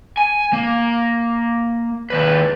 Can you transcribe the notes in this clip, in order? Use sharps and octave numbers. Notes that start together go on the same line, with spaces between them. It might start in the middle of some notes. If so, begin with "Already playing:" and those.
G#5
A#3
D#2 B4